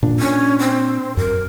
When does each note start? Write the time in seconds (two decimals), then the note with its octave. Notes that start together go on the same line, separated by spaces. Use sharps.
0.03 A#2 D4
0.20 C#4
0.59 C4
1.17 F#2 A#4